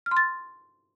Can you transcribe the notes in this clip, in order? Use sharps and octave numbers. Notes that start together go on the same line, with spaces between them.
F6
C6
A6